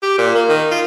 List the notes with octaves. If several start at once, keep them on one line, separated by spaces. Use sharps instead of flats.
G4
A#2
A#3
D#3
F4